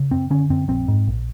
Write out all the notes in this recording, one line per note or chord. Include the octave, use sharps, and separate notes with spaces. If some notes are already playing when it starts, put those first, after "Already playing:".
Already playing: C#3
F#2 C4
D3 C#4
F#2 C4
A#1 C4
G#2
A#1